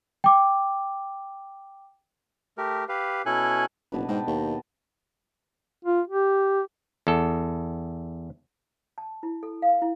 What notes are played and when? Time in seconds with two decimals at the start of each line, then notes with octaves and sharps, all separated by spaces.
0.24 G5 D6
2.58 A3 G4 A#4
2.89 G4 B4 F5
3.26 B2 C#4 E4 A4 G#5 F#6
3.92 F#1 B2 D4 B4
4.08 G#2 D#5 G5 A5
4.27 D#2
5.85 F4
6.08 G4
7.07 E2 A4
8.98 A5
9.23 E4
9.43 A4
9.62 F5
9.82 E4